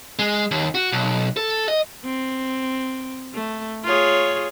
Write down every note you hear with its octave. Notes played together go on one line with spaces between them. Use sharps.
G#3
D#2
F#4
B1
A4
D#5
C4
A3
F4 G#4 C#5